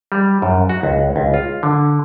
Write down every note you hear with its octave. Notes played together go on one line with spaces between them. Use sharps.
G3
F#2
F#4
C#2
C#2
F4
D3